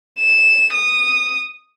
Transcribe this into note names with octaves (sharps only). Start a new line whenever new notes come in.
E7
D#6